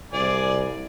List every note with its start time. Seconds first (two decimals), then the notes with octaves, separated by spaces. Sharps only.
0.13 C2 G#4 D5